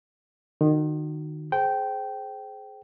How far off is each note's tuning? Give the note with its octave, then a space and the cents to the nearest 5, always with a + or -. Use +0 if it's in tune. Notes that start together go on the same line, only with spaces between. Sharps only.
D#3 -30 F#4 -10
G#4 +25 C5 +0 G5 -15